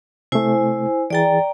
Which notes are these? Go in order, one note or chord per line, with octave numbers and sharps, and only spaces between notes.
C3 A3 E4 C5 G#5
E3 G#4 D5 G5 A#5 A6